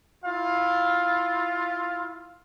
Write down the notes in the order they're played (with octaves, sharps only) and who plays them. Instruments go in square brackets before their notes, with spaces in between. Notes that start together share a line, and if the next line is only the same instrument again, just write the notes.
[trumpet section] E4 F4 F5